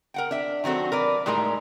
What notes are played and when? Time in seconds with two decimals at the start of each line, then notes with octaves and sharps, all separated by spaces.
0.14 A#4 F#5 G5
0.31 D4 E5
0.64 D#3 F#3 C4 F#4 A4
0.92 A#4 B4 D5
1.26 A2 G3 G#3 D#4 A#4